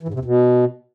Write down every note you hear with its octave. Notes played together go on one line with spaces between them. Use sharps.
E3
G#2
C3
E2
B2